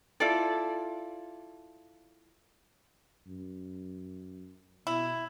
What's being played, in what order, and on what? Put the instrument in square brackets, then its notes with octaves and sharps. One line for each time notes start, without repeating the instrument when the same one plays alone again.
[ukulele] E4 F4 A4 D5
[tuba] F#2
[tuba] B2 [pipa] E4